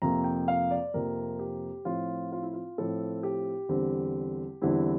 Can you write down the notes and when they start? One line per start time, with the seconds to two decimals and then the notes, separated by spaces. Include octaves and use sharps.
0.02 F2 C3 F3 A#3 A#5
0.24 G5
0.48 F5
0.71 D5
0.94 F2 C3 F3 A#3 A#4
1.39 G4
1.85 A2 F3 C4 F4
2.32 F4
2.43 E4
2.53 F4
2.78 A2 F3 C4 A4
3.23 G4
3.69 E2 D3 G3 C4
4.62 E2 D3 G3 C4 E4